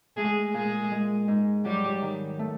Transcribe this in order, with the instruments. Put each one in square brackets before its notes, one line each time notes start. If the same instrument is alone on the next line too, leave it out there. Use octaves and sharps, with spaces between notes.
[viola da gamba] G#3 G#4 [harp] A3
[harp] A#2 [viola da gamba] G#3 G#4
[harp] G#3
G#2
[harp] F#3 [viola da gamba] G3 G4
[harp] D#3
A3